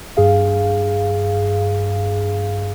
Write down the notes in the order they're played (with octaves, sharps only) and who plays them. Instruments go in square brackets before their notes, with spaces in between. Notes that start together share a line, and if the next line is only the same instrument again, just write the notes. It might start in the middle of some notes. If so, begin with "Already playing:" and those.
[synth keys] G2 G#4 F5